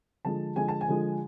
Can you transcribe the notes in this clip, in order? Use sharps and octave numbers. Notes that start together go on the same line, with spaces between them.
D3 F3 G#3 A5
D3 F3 G#3 G#5
A5
G#5
D3 F3 G#3